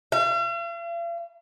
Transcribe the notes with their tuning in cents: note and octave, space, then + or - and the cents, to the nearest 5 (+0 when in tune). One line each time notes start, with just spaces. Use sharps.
F5 -45